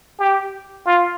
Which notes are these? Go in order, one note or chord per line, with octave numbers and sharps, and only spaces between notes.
G4
F4